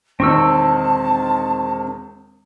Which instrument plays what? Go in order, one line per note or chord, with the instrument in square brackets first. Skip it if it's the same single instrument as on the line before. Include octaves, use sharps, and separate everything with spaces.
[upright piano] E1 D#3 [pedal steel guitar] C4 C#6 E6 [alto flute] A5